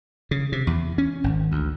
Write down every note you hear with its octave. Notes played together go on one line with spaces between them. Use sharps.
C#3
C3
E2
C#4
G#1
D2